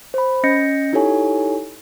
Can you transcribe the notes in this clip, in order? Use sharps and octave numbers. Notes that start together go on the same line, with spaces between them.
C5 B5
C#4 D#5 G6 A#6 C#7
D#4 E4 G4 A4 C#5 G#5